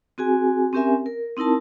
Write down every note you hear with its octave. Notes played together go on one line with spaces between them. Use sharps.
C4 F#4 G#4 G#5
C4 C#4 G4 A#4 E5 G#5
A#4
C4 D#4 E4 A#4 A5